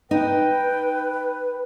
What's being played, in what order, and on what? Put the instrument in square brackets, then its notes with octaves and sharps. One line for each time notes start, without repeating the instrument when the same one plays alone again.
[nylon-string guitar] D#4 [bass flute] B4 [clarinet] G5